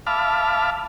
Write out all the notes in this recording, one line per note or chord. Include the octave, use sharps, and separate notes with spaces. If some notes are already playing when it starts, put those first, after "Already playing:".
E5 F5 A5 B5 D6 F6